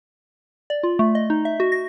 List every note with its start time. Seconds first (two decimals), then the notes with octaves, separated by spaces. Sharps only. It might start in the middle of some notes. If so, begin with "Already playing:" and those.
0.70 D5
0.83 F4
0.99 A3
1.15 D#5
1.30 D#4
1.45 E5
1.60 F#4
1.72 A#6